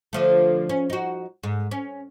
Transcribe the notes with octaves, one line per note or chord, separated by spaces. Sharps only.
D3 F3 A3
C#4
D#4 F#4
G#2
C#4